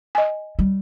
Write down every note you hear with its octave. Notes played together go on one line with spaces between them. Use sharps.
D#5 G#5
G3